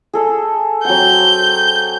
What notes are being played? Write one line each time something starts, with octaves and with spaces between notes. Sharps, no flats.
G#4 A4 D#5
F#3 C4 F#5 G6